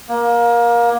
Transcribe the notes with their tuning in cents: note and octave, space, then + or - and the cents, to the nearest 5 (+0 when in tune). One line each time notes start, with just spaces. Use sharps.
A#3 +20